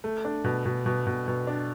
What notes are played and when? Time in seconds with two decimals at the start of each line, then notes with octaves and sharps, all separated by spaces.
0.04 A3
0.25 D4
0.44 B2
0.65 B2
0.86 B2
1.07 B2
1.28 B2
1.47 D4